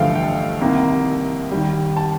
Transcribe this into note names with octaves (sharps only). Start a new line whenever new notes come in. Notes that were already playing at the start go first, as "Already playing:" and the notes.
Already playing: A1 G2 D3 F3 A3 F5 G5
G5
C2 C3 D#3 A#3
D#2 D#3 G3
A5